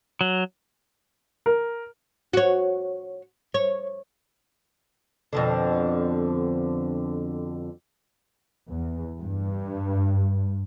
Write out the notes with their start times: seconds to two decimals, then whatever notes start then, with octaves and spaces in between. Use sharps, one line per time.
0.21 F#3
1.46 A#4
2.33 F#4 C#5
3.54 C#5
5.33 F2 B2 D3
8.69 E2
9.20 G2